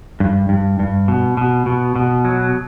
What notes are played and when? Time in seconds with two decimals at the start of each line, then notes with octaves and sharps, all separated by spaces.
0.20 G2
0.49 G2
0.79 G2
1.08 B2
1.37 B2
1.66 B2
1.96 B2
2.25 F#3